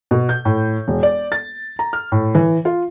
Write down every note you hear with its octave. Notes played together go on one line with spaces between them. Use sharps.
B2
G6
A2
E1
D5
A6
A#5
F6
A2
E3
F4